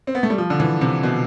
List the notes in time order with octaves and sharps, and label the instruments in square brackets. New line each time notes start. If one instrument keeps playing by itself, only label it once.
[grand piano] C4
B3
A3
G3
F3
D3
E3
C3
B2